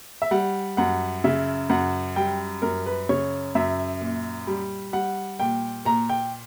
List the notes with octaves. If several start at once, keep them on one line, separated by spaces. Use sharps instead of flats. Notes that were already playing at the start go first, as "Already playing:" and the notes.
E5
G3 F#5
F#2 F#5
C#3 E5
F#2 F#5
G3 G5
F#2 A#4
B4
C#3 C#5
F#2 E5
A#2
G3
G3 F#5
A#2 G5
A#2 A#5
G5